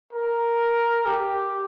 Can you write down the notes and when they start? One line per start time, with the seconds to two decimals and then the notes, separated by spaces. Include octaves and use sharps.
0.13 A#4
1.05 G4